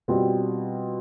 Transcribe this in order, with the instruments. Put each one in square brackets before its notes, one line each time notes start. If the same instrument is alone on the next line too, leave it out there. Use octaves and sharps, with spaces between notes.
[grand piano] B2 G3 C4 F4